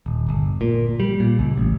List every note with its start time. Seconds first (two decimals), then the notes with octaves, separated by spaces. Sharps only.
0.06 D#1
0.29 G1
0.61 A#2
1.00 G3
1.20 A#2
1.39 C#2
1.58 A1